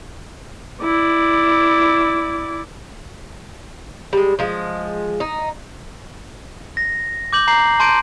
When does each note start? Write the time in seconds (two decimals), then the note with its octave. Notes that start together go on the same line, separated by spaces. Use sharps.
0.84 E4 D5
4.13 G3 G#3
4.39 F3 G#3
5.20 D#4
6.77 A#6
7.33 D6 G6 F#7
7.48 A#5 G6 C7 F#7
7.80 A5 C6 G6 D7